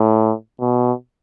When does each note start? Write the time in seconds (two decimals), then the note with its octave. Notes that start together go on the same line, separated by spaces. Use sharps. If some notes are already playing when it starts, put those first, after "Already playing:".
Already playing: A2
0.60 B2